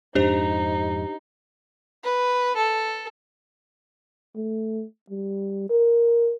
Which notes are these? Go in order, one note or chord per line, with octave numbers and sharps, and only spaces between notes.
F2 G#2 D4 D#4 G4 C5
B4
A4
A3
G3
A#4